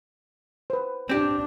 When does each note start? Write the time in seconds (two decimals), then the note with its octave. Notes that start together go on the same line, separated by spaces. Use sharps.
0.70 B4 C5
1.09 C4 D4 G4